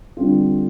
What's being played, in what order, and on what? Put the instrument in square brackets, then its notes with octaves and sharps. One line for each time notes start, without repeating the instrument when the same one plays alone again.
[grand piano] D3 G3 C4 F4